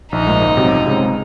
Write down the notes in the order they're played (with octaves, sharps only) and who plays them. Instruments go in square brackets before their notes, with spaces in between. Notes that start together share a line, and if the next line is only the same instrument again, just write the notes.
[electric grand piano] A#1 [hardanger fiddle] D#4
[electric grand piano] G#2 F3 A#3
C#2
C3 F#3
C#2
C#3 G#3 C4